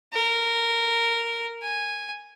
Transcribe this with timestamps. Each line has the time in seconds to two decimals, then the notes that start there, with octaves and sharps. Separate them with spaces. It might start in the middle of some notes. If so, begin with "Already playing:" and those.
0.13 A#4
1.62 G#5